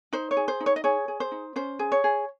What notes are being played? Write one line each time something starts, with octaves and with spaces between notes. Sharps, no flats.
D#4 C5
C#5
G#4
C5
D#4
C#5
D#5
G#4 C#5
G#4
C5
D#4
C#4 C5
G#4
C#5
G#4